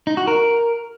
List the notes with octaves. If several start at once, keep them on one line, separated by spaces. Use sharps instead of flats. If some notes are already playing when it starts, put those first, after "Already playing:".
D#4
F#4
A#4